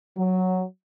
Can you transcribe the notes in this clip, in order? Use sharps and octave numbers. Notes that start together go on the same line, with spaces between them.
F#3